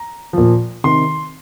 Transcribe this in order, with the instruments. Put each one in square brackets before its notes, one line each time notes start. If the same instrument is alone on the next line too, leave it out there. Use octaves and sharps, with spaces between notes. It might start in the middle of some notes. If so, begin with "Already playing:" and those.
Already playing: [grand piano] A#5
A#2 F3
C3 D#3 C6